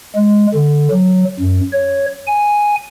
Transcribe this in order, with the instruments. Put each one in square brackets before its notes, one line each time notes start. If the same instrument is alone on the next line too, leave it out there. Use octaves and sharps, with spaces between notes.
[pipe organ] G#3
D3
F#3
F#2
C#5
G#5